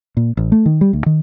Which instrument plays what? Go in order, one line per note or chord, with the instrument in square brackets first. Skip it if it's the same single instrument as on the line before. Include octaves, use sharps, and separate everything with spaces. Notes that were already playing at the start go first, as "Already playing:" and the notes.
[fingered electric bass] A#2
A1
A3
D#3
G3
D2
D#3